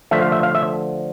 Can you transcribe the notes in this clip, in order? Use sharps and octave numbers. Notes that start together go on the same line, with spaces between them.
D3 F3 A3 E5
F5
E5
F5
E5